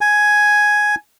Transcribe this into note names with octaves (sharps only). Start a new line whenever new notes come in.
G#5